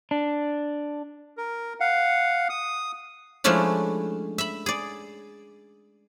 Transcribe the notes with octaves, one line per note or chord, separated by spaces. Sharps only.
D4
A#4
F5 F#5
D#6
F3 G#3 A3 C#4 D4 E4
E5 B5
G#4 D5